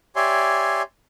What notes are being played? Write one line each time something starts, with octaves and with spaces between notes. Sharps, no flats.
G4 C#5 D5 E5 G#5 C6